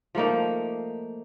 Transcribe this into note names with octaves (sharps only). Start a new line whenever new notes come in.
F3 A3 A#3 D#4